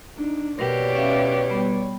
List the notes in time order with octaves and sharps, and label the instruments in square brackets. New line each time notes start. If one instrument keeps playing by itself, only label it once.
[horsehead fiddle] D4 [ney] D#4
[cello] B2 G4 [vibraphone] A#4 [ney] B4 [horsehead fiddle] C#5 D5
[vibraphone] C#4 E5 F5
G3 B3